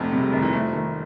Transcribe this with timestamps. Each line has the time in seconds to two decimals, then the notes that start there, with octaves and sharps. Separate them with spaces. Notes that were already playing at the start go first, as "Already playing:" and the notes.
Already playing: F1 F2 A3
0.12 C3 G3
0.22 G#3
0.32 F1 D#3
0.42 E3
0.52 F3 A3
0.62 F3
0.73 D#3 A3